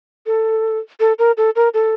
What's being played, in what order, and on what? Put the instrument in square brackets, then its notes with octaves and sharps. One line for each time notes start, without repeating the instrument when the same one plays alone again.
[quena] A4
A4
A#4
A4
A#4
A4